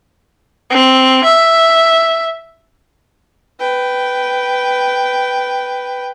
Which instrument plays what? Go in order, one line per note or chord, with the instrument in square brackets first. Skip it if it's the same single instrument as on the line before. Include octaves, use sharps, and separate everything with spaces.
[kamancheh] C4
E5
[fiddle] B4 G5